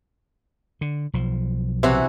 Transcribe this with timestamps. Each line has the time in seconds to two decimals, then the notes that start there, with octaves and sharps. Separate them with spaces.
0.81 D3
1.13 B1 F3
1.83 C3 E3 F#4